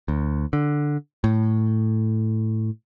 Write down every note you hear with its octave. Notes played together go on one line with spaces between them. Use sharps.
D2
D3
A2